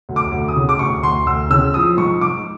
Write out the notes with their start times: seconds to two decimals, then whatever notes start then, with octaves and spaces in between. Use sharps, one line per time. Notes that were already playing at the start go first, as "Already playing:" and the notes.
0.09 D2
0.16 D6
0.31 D2
0.48 D#6
0.56 C#3
0.69 D6
0.79 D2 C#6
1.03 D2 C6
1.26 D2 E6
1.50 C#3 E6
1.74 F3 D#6
1.97 G#2 C#6
2.21 G#2 D6